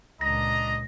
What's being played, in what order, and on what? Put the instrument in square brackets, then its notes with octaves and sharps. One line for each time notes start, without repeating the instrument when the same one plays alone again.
[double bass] C#2 A#2 [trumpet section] D4 A#5 [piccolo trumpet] D#5 [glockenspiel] A#6